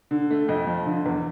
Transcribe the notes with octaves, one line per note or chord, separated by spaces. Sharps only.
D3
A3
F2 D#5
F3
D3
E2